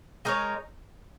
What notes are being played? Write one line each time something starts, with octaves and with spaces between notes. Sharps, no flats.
G#3 D#4 A#4 C#5